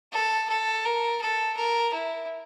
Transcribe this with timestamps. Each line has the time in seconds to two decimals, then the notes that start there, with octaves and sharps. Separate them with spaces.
0.12 A4
0.49 A4
0.85 A#4
1.21 A4
1.57 A#4
1.93 E4